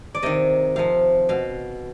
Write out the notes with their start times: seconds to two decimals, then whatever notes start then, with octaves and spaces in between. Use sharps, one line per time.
0.15 D5
0.22 C3 D#3 D#5
0.76 C3 F3 F5
1.29 B2 F5